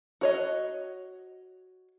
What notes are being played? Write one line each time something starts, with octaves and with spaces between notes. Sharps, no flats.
F#4 C#5 D#5